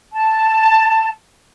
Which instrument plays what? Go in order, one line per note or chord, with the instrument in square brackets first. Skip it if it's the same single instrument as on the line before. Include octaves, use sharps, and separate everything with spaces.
[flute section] A5